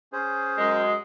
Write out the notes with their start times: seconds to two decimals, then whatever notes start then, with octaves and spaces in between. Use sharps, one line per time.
0.13 C#4 G#4 C5
0.56 F#2 G#3